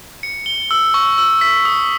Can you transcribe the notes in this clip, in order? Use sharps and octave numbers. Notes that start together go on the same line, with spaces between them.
C#7
G7
E6
C#6
E6
B6
D#6